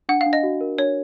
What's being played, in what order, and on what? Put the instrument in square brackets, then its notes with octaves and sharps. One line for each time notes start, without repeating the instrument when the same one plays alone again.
[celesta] D4 [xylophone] F#5
[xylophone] F5
[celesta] D4
[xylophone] D#5
[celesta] F#4
A#4
[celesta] D4 [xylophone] C#5